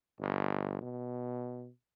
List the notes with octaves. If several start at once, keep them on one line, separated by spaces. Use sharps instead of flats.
G1
B2